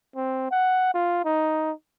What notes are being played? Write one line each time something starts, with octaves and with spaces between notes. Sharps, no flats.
C4
F#5
F4
D#4